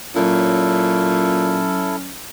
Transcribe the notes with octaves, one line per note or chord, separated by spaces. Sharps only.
A#2 F#3 C#4 E4 A4